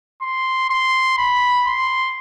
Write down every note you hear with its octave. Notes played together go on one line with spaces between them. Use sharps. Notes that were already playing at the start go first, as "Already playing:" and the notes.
C6
C6
B5
C6